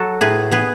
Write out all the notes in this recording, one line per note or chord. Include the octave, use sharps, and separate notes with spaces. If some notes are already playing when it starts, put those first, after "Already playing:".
Already playing: F#3 F#4 A4
A2 G#4 B4
B3 G#4 B4